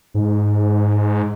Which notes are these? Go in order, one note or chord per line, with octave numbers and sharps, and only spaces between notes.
G#2